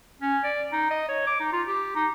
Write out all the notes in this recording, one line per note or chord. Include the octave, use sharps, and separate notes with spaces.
C#4
D5
D#4
D#5
C#5
D6
D#4
F4
G4
D#4